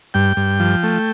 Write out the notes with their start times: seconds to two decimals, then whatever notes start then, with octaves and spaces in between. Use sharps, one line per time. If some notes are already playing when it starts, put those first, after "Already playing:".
0.14 G2 G5
0.37 G2
0.60 F3
0.83 A3